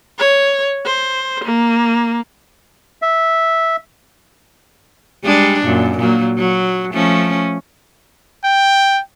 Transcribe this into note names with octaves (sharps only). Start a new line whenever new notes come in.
C#5
C5
A#3
E5
G3 G#3 D4
F#2 A#2
A#2 F#3 A#3
F#3
F3 A3 C#4
G5